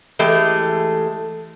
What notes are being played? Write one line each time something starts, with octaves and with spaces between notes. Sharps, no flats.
E3 G#3 A3 G4